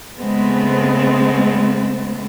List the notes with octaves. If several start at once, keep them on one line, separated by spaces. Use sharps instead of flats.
C#3 G#3 A3 B3 C4